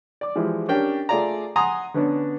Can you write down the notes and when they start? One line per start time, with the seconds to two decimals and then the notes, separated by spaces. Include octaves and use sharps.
0.21 D5 D6
0.36 E3 F3 G#3 E4 G4
0.68 C#4 D4 G4 A#4 G5
1.09 A3 F4 G#4 D5 F5 A#5
1.56 F#5 G#5 A#5 C6 D#6
1.94 D3 B3 C#4 D4